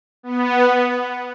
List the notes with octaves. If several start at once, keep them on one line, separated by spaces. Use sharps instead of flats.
B3